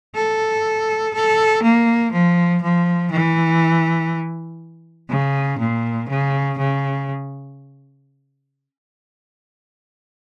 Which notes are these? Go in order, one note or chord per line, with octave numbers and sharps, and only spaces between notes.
A4
A4
A#3
F3
F3
E3
C#3
A#2
C#3
C#3